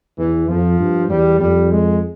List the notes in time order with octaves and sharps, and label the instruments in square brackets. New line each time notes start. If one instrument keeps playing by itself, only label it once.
[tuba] E2 [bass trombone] E3
[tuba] F2 [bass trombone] F3
[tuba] G2
[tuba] E2 [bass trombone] G3
[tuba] F2 [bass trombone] G3
[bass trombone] G#3